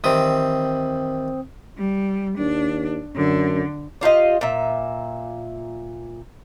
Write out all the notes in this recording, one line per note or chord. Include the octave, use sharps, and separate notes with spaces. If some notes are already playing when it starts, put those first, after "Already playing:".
D#3 E3 G3 C4 D#6
G3
D#2 D4
F#2 D3
D4 F4 G4 D#5
A#2 E5